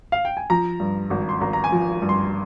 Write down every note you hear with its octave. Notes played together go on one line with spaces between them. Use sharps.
F5
G5
G#5
F3 A#5
G2
G#1
C6
G#1 A#5
A#5
G#5
F3
G2
C6